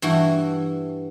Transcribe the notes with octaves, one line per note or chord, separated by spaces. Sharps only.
G2 E3 F#4